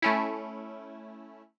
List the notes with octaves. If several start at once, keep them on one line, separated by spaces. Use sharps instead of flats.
A3 C#4 E4